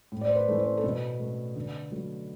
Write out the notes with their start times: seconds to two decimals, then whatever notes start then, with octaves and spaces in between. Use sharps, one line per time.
0.12 A2
0.21 D5
0.28 C5
0.36 B4
0.48 E3 A3
0.59 C5
0.78 A4
0.84 B2 B4
1.20 A3
1.56 D3
1.92 F#3 A3